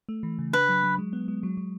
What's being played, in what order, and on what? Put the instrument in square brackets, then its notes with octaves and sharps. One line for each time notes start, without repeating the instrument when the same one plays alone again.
[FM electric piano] A3
E3
C#3
[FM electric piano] D4 [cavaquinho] B4
[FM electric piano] F#3
F#3
G#3
B3
G#3
F#3
F#3